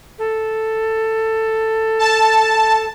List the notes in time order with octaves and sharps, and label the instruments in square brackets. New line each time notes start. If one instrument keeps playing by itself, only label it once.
[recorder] A4
[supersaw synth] A5